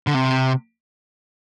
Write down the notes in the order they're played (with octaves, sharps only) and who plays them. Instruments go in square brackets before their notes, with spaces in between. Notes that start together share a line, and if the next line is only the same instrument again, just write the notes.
[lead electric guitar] D3
C3